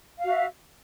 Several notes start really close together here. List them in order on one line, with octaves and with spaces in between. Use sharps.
F5 F#4 E5